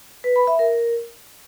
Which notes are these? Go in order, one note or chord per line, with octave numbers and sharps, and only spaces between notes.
B4
B5
E5
A#4